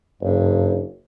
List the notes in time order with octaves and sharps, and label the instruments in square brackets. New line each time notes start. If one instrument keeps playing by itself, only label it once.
[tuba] F#1 [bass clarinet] G2